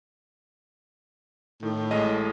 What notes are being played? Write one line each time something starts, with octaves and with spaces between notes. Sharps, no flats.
A2 D#3
A1 G#3 D#5